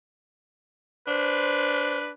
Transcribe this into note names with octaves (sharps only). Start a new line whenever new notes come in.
D4 B4 C5